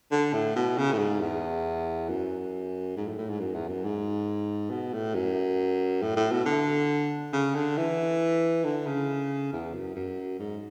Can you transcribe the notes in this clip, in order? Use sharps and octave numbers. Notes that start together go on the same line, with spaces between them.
D3
A2
B2
C#3
A2
G#2
E2
F#2
G#2
A2
A2
G#2
F#2
E2
F#2
G#2
B2
A2
F#2
A2
A2
B2
D3
C#3
D3
E3
D3
C#3
E2
F#2
F#2
G#2